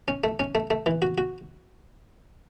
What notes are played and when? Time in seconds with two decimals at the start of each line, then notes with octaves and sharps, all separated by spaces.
0.08 C#4
0.24 A3
0.40 C#4
0.55 A3
0.70 A3
0.86 E3
1.02 F#4
1.18 F#4